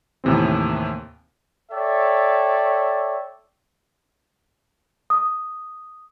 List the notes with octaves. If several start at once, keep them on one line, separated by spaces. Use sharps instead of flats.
D#2 A2 C3 E3 C4
A4 C#5 D5 E5 G5
D#6